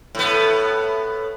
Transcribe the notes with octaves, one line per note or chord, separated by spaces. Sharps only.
A2 B3